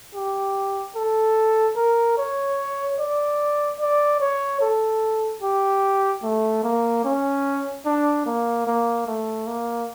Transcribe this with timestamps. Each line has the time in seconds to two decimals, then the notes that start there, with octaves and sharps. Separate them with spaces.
0.15 G4
0.96 A4
1.77 A#4
2.18 C#5
2.99 D5
3.80 D5
4.20 C#5
4.61 A4
5.42 G4
6.23 A3
6.64 A#3
7.05 C#4
7.86 D4
8.26 A#3
8.67 A#3
9.07 A3
9.47 A#3